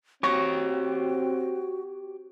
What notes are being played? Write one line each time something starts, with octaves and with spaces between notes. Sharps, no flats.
C4 F#4 G4 C#5 C#6 A#6